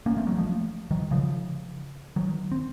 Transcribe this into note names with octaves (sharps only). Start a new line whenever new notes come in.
A#3 C#4
A3 C4
F#3 A#3
F3 A3
D#3 F#3
C#3 F3
D#3 F#3
C4